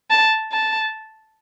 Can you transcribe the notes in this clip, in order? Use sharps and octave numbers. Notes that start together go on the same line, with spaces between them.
A5
A5